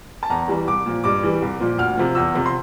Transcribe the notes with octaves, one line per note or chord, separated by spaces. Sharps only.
A5
E2 A#5
E3 G3
C2 D6
A#2 F3
G2 D6
E3 G3
C2
A#2 F3
D2 F6
C3 F3
E2 E6
C3 F3
C6